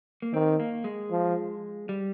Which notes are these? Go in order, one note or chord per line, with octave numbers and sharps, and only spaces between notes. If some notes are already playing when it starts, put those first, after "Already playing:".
A#3
D#3 C4
A#3
G#3
F3
G3